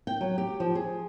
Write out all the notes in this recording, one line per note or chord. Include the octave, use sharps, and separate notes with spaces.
G5
F#3
G4
F3
G#4